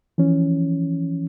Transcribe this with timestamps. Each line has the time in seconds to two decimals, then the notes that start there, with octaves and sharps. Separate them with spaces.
0.18 E3 F3 C#4